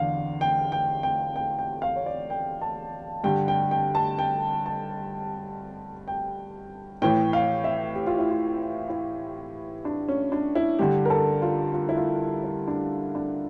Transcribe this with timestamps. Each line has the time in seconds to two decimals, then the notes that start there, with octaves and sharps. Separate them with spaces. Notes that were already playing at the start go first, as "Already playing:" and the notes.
Already playing: E2 D3 F5
0.41 G5
0.72 G5
1.03 G5
1.36 G5
1.59 G5
1.82 F5
1.96 C#5
2.06 D5
2.30 G5
2.62 A5
3.24 G2 D3 G5
3.48 G5
3.71 G5
3.95 A5
4.19 G5
4.66 A5
6.08 G5
7.02 A2 E3 G5
7.33 F5
7.64 E5
7.95 G4
8.06 F4
8.19 E4
8.30 F4
8.89 E4
9.85 D4
10.08 C#4
10.32 D4
10.55 E4
10.79 G2 D3 G4
11.05 A#4
11.10 A4
11.42 F4
11.74 F4
11.89 E4
11.97 F4
12.44 E4
12.68 D4
13.15 D4